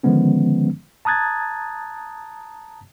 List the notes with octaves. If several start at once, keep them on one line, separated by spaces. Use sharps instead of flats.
D3 D#3 F3 G#3 B3 C#4
A5 A#5 D#6 F#6 G#6 A6